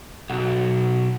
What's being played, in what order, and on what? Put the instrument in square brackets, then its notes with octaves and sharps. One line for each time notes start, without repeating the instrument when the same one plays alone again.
[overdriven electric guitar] B1 [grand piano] F#4